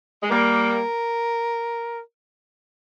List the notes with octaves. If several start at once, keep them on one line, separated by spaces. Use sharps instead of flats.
G#3
G3 A#3 A#4